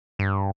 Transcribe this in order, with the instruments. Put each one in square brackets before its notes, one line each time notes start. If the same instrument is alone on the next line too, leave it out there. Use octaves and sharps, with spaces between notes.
[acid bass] G2